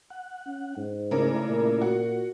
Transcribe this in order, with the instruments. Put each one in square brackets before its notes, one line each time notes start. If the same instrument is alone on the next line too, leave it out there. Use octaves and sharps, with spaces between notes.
[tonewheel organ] F#5
[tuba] C#4
G#2
[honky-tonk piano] C#3 A#4 [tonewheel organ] A3 E4 D5
[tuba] A#2
[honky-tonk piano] F#4